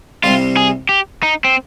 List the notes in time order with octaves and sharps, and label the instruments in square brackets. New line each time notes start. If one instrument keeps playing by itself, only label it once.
[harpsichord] C2 C3 G3 [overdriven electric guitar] F4
[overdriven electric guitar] G#4
G4
D#4
C4